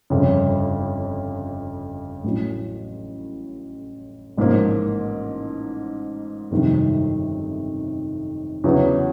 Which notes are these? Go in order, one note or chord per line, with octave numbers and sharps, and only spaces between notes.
G1 F2 C#3
A1 A2 F#3
A1 G#2 F3 A#3
G1 F2 C3 D#3 F#3
E2 C#3 F#3 B3 E4